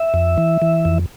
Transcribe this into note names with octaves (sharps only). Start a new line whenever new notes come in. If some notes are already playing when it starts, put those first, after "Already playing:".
Already playing: E5
F2
E3
E3
F2